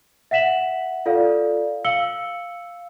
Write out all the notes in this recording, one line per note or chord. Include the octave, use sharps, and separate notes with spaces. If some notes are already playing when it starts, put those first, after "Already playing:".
E5 F#5 B6 E7 F#7
F4 A4 D5 F5
F5 E6 C#7 F#7 G7